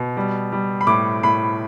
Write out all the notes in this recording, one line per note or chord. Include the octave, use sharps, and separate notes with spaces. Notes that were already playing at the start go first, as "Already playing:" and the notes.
Already playing: B2
G3
G3
B5
A2 D6
A2 B5